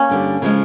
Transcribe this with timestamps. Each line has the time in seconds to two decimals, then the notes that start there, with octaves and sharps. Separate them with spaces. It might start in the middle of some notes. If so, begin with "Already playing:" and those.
Already playing: A#3 C#4
0.09 G2 D3 G3
0.42 C#3 F3 G#3